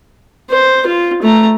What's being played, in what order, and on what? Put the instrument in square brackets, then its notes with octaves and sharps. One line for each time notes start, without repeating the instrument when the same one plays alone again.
[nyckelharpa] C5
F4
A3 A#5